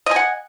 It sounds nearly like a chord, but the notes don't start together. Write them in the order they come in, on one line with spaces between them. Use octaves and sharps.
D#5 G#5 F#5